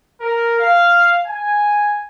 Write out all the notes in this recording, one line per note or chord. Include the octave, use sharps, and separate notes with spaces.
A#4
F5
G#5